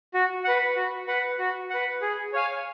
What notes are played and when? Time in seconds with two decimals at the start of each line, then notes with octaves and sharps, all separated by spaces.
0.14 F#4
0.44 B4 F#5
0.76 F#4
1.07 B4 F#5
1.39 F#4
1.70 B4 F#5
2.02 G#4
2.33 C#5 F5 G#5